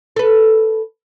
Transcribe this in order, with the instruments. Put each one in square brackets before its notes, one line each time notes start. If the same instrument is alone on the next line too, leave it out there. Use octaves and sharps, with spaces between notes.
[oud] A4 B4